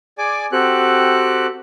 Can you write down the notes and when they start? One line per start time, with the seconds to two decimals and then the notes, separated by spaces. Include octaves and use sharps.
0.18 G#4 D5 G#5 D6
0.52 C4 F#4 G4 A4 F#6